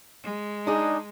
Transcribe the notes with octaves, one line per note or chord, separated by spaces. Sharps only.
G#3
D4 D#4 G#4